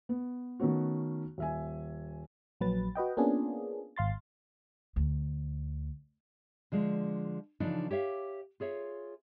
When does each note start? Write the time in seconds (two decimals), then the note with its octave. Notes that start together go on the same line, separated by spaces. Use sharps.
0.09 B3
0.60 D#3 A3 B3 C#4 F#4
1.38 D#1 E5 G#5
2.61 A#1 F#3 B4 A6
2.95 F#4 B4 D#5 G5
3.17 A#3 B3 C#4 D4 F4 G#4
3.96 G#1 F5 C6 A6
4.96 D2
6.72 D3 F3 G#3
7.60 C#3 E3 F3 D4 D#4
7.91 G4 C#5 E5 F5
8.60 F4 G#4 C#5 E5